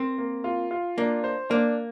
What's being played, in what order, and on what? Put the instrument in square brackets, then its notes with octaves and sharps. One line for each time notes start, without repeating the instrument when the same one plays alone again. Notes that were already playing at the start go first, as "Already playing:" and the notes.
Already playing: [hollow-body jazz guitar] C4 [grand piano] A#4
[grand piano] A#3
F4
F4
[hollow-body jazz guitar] A#3 [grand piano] D4
[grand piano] C5
[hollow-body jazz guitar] A#3 [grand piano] D4